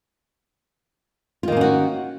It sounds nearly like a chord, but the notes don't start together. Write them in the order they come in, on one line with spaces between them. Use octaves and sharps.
F4 D#3 A#3 C#4 F#4